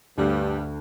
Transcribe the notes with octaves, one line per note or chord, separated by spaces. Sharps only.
D2 G2 G3